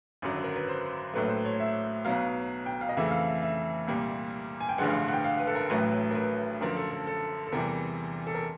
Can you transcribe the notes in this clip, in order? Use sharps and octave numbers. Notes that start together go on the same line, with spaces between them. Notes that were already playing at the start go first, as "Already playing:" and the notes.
G#1 F#2 D3 F#3
A#4
B4
C5
A#1 A2 F#3 A3 B4
C5
C#5
E5
B1 B2 F#3 F5
G5
F5
D#5
F2 C#3 E3 A3 E5
F5
E5
E5
C2 A#2 G3
G#5
G5
A1 G2 D3 F3 G#3 F#5
F5
F#5
G5
F5
B4
A4
A#4
A1 A2 F#3 A3 B4
A#4
B4
F#2 D3 F3 A#4
A4
A4
A4
A4
E2 C3 E3 G3 A#4
A4
A#4